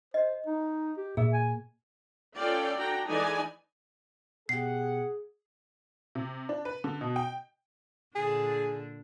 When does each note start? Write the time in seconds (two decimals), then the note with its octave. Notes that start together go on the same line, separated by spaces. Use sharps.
0.14 C5 D#5
0.46 D#4
0.98 G4
1.17 A#2 G#4 E5
1.33 G#5
2.36 C#4 F4 A4 D5 F5 G5
2.76 D4 F#4 G5 A#5
3.07 E3 G#3 D#4 A4 D5 G#5
4.49 B2 G4 G#4 F#5 C7
6.15 C3
6.49 D4
6.65 B4
6.84 D3
7.01 B2
7.16 G5
8.15 A#2 D3 D4 G#4